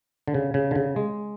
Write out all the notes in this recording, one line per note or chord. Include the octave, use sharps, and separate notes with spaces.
D3
C#3
C#3
D3
C#3
G#3